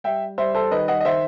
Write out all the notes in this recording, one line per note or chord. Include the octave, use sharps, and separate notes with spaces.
G3 E5 G5
G3 C5 E5
A4 C5
D#3 B4 D#5
D#5 F#5
D#5
D#3 C5 E5